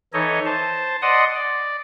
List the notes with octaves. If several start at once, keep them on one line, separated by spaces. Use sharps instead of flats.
E3 D#4 A4 C#5 D#5
C5 A5
D5 D#5 F#5 C6 D#6
D5